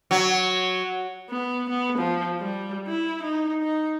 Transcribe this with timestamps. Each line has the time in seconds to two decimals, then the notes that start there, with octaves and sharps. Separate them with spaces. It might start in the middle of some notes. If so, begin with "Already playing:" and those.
0.11 F#3
1.30 B3
1.69 B3
1.98 F3
2.39 G3
2.87 E4
3.23 D#4
3.63 D#4